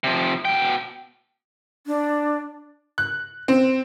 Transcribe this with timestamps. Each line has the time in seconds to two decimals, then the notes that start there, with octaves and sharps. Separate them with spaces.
0.04 C3 F3
0.45 B2 G5
1.87 D4
2.98 F#6
3.48 C4